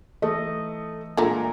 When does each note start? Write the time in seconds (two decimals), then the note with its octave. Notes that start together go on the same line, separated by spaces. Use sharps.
0.22 E3 A3 D#5
1.17 A#2 D3 G#3 A3 A#5